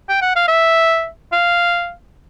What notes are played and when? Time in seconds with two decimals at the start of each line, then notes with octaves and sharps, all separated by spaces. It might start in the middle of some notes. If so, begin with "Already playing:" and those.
0.09 G5
0.22 F#5
0.36 F5
0.48 E5
1.32 F5